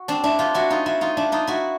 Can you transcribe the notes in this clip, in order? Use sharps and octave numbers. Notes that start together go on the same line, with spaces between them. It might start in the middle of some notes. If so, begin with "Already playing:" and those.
Already playing: F#4
C4 D4
D4 E4
F4 G4
E4 F#4
D#4 F4
E4 F#4
D#4 F4
D4 E4
D#4 F4
E4 F#4